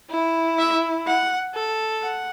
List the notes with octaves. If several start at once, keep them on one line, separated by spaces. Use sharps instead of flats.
E4
E5
F#5
A4
F#5